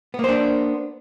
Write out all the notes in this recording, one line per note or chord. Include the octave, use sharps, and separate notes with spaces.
A#3 B3 D4 C5